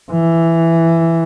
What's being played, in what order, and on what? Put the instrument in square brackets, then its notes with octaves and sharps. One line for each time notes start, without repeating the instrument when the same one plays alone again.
[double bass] E3